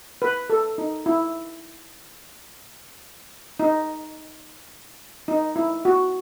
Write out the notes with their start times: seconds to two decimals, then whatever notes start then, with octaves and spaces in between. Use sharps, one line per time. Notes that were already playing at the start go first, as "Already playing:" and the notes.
0.22 B4
0.50 A4
0.78 D#4
1.06 E4
3.60 D#4
5.28 D#4
5.56 E4
5.85 F#4